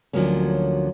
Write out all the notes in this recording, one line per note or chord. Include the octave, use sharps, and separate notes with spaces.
D2 D3 F3 F#3 A#3 C#4